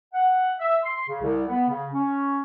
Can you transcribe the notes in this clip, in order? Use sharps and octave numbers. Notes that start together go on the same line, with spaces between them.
F#5
E5
C6
C#3
C2
B3
C#3
C#4